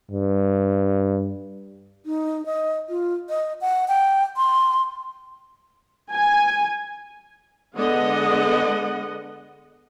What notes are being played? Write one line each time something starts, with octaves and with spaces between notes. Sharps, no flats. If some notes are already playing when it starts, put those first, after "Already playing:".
G2
D#4
D#5
F4
D#5
F#5
G5
C6
G#5
D3 G#3 B3 D#5 F#5